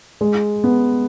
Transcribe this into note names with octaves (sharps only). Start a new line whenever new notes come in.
G#3
B3